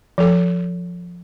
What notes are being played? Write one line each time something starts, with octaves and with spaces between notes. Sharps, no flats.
F3 A4